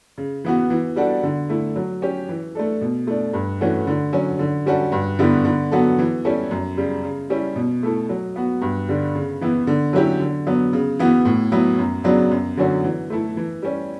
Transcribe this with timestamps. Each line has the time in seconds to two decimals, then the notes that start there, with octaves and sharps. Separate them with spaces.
0.18 C#3
0.45 E3 B3 F#4
0.70 E3
0.96 G3 D4 F#4 A4
1.23 D3
1.49 A3 E4
1.76 F#3
2.02 C#4 G4
2.29 E3
2.55 A3 D4 A4
2.81 B2
3.07 A3 D4
3.33 G2
3.61 E3 A3 C#4 F#4
3.87 D3
4.13 F#3 C#4
4.39 D3
4.66 G3 C#4 F#4 A4
4.92 G2
5.19 D3 G3 B3 E4
5.45 D3
5.71 F#3 B3 F#4 A4
5.98 E3
6.25 G3 C#4 E4 A4
6.51 F#2
6.77 C#3 G3
7.04 C#3
7.30 G3 C#4 E4
7.56 B2
7.83 A3 E4 A4
8.09 F#3
8.36 B3 F#4
8.62 G2
8.89 D3 G3
9.15 C#3
9.41 E3 B3 E4
9.67 D3
9.93 F#3 C#4 E4 G4
10.20 D3
10.47 F#3 B3
10.73 C#3
10.99 E3 B3 F#4
11.25 A2
11.52 F#3 B3 E4
11.79 F#2
12.04 C#3 F#3 B3 D4
12.31 F#2
12.57 D3 F#3 C#4 F#4
12.84 E3
13.10 A3 E4 A4
13.37 E3
13.62 G3 C#4